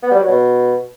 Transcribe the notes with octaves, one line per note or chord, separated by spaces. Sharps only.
B3
G3
F#3
B2